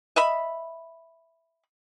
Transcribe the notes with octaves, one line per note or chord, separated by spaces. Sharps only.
D#5 E5 B5